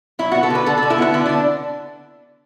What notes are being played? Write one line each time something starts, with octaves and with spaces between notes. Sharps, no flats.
F#3 E4
B3 F#4
A4
D3 B4
D3 A4
D3 A4
E4
B3 F#4
D3 E4
D3 D4